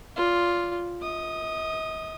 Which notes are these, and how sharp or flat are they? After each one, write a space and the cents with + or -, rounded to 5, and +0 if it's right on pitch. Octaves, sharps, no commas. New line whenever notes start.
F4 +0 D5 -30
D#5 +40 D#6 -10